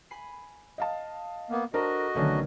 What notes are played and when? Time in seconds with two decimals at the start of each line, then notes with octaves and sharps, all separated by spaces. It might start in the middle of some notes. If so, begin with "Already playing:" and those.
0.11 G#5 B5 C7
0.78 D#5 F5 A5
1.49 A#3 B3
1.74 D4 F#4 A4 A#4 C5 D#5
2.15 B1 D3 D#3 A3 C#4 D4